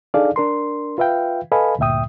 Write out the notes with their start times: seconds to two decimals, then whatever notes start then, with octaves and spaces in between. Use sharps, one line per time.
0.14 D4 D#4 G#4 A4 D5 F5
0.36 D4 A#4 C6
0.98 F4 B4 E5 F5 G5
1.51 A4 B4 D#5 F5 G#5 B5
1.79 D2 G2 A#2 E5 G5 D#6